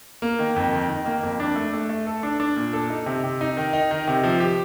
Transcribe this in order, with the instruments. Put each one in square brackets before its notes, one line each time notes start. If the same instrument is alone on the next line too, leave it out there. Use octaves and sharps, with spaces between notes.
[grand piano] A#3
D#3
F2
D#3
D#3
A#3
F2
D4
A3
A3
A3
A4
D4
D4
A#2
A4
D#4
C3
C3
D#4
D#3
D#4
D#3
C3
F3
G4